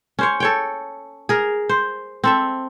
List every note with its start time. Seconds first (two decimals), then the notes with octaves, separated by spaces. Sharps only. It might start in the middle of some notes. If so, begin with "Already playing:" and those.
0.19 C#4 C5 C#5
0.40 A4 C#5 G5
1.29 G#4 A#4
1.69 C5
2.24 C4 A4 E5